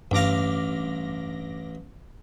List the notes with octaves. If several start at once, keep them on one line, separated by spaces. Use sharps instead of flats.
A1 G2 F5 D6 A#6